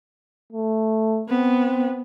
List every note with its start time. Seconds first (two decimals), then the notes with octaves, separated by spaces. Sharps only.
0.53 A3
1.29 B3 C4